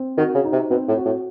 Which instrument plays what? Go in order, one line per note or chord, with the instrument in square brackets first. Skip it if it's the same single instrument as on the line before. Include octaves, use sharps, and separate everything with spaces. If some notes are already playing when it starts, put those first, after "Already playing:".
Already playing: [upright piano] C4
[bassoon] D#3 [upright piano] F#4
[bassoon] C#3
[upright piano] D#4
[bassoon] C3
[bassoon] B2 [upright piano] C4
[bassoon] A2
[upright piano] F#4
[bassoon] A2